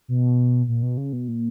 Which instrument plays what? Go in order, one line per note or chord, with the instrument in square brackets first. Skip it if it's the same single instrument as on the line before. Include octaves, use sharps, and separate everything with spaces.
[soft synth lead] B2
A#2
B2
C#3
B2
A#2